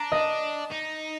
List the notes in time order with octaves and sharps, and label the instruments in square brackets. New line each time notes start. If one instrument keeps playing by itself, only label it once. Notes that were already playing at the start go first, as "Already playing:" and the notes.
Already playing: [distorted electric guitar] D4 [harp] A#5
[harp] D#5
[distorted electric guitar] D#4